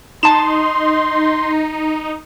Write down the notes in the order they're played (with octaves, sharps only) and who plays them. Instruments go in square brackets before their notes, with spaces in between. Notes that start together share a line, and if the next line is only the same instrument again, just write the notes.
[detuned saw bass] D#4 [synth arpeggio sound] A5 E7 [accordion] C6